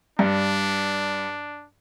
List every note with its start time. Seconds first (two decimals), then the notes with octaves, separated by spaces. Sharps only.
0.19 G2 D4